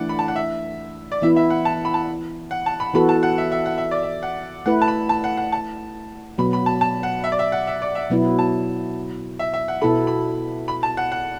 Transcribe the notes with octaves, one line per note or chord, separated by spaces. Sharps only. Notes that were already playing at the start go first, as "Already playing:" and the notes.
Already playing: E3 A3 D4 D5 F#5
B5
A5
F#5
E5
D5
E3 B3 E4 E5
E5
F#5
A5
B5
A5
F#5
A5
B5
E3 B3 F#4 A4 B5
A5
F#5
E5
E5
F#5
E5
D5
E5
F#5
A3 E4 B4 F#5
A5
B5
A5
F#5
F#5
A5
B2 F#3 B3 B5
B5
A5
A5
F#5
E5
D5
E5
F#5
E5
D5
E5
B2 F#3 B3 E4
A5
E5
E5
F#5
B2 B3 E4 A4 B5
B5
B5
A5
F#5
F#5